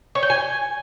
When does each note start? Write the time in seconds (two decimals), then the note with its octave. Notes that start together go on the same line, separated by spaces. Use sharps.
0.15 C#5
0.23 G5
0.30 G#5